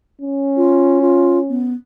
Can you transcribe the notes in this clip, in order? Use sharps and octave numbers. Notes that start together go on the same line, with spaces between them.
C#4
F4
F4
B3